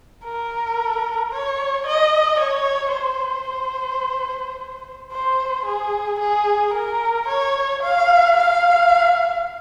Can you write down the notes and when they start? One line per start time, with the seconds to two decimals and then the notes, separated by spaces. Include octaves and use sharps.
0.24 A#4
1.32 C#5
1.87 D#5
2.40 C#5
2.95 C5
5.12 C5
5.66 G#4
6.20 G#4
6.74 A#4
7.28 C#5
7.83 F5
8.37 F5